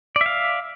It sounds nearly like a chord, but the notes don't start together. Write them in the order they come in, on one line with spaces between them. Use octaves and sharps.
D5 E5 F5